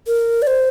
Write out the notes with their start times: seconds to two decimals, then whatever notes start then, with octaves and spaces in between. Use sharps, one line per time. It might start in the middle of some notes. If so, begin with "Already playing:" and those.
0.07 A#4
0.42 D5
0.47 C5